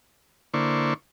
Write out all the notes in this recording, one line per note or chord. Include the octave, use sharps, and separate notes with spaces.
D3 A#3 E4 C5 D5 C#6